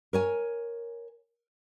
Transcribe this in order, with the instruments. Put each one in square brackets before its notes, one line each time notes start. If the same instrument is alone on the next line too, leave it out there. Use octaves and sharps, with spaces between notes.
[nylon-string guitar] A#4 C#5 G#5